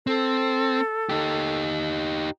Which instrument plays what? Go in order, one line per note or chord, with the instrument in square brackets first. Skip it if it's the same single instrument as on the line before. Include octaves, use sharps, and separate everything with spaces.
[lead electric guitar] C4 [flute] A4
[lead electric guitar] D#4 G4